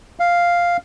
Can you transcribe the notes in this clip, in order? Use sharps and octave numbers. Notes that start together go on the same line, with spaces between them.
F5